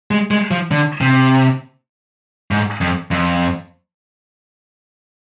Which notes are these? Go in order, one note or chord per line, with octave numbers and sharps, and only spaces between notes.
G#3
G#3
F3
D3
C3
G#2
F2
F2